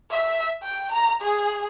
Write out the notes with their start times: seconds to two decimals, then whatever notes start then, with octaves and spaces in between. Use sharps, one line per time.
0.11 E5
0.63 G5
0.92 A#5
1.22 G#4